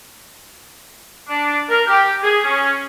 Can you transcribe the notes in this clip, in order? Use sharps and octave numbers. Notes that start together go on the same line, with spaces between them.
D4
A#4
G4
G#4
C#4